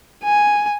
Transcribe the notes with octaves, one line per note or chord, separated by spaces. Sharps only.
G#5